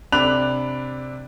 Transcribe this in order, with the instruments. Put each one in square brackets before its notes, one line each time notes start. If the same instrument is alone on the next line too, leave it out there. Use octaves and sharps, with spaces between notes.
[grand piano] C3 D4 B5 F#6 F7